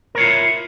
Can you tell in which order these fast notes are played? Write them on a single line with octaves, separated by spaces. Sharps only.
A#4 C#5 F4 E4